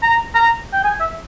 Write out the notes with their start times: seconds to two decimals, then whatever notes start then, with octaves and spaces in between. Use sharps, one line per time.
0.03 A#5
0.35 A#5
0.73 G5
0.84 G#5
1.00 E5